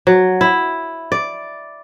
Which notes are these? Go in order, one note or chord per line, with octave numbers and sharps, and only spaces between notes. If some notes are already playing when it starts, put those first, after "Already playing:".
F#3
E4
D5